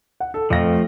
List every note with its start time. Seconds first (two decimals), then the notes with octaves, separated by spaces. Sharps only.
0.20 F#5
0.34 A4
0.50 F2 F3 A3 F5 A#6